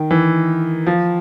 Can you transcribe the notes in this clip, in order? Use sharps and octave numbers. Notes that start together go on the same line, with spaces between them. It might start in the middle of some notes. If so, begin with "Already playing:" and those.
Already playing: D#3
E3
F3